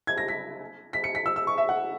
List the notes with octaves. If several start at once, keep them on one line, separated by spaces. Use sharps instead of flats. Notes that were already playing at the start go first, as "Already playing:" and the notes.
G#6
A#6
B6
B6
C#7
B6
E6
E6
C#6
E5
F#5